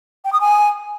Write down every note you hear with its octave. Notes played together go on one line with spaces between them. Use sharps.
G5
D#6
G#5